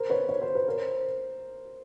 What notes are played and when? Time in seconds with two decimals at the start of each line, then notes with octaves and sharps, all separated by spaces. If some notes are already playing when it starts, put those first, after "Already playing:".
Already playing: A#4 C5
0.10 B4 C#5
0.29 C#5
0.42 C5
0.55 B4
0.68 A#4 C5